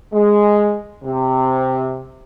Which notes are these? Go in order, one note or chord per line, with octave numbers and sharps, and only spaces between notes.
G#3
C3